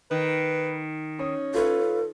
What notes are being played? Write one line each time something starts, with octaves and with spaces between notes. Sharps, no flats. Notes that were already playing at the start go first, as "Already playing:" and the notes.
D#3 B4
C#4 D#6
F4 A4 B4 C#5